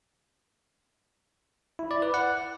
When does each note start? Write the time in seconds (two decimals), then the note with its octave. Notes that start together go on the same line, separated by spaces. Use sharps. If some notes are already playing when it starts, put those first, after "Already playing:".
1.79 E4
1.91 D5
2.02 B4
2.14 F#5